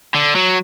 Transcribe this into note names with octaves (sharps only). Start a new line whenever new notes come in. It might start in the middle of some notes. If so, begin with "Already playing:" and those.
D3
F#3